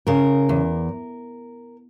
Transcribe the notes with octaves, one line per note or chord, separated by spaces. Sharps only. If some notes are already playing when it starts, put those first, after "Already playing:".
C#3 A#4
E2